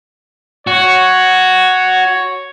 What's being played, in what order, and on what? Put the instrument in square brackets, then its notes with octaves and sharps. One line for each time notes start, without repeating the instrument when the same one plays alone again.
[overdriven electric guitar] F#4 [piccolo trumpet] C#5